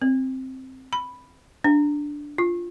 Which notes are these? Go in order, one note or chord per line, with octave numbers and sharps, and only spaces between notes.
C4
B5
D4
F4